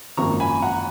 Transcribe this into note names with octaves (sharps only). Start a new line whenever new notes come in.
G#1 F#2 F3 A#3 A#5 C#6
G#5 B5
F#5 A#5